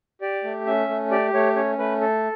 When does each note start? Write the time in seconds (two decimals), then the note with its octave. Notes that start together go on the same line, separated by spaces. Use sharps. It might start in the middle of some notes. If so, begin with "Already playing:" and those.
0.21 G4 D5
0.44 A3
0.66 C#4 E5
0.89 A3
1.11 G4 D5
1.33 A3 C#5
1.56 C#4 C#5
1.78 A3 B4
2.01 A4